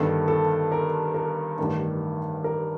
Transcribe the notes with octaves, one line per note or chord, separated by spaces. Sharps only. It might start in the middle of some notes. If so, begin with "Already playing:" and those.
Already playing: G1 G2 D#3 A4
A4
A#4
A#4
A1 G2 D#3
A#4